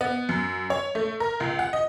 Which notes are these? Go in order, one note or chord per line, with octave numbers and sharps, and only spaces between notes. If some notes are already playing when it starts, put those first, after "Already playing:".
B3
F#2
C#5
A3
A#4
C#2
F#5
D#5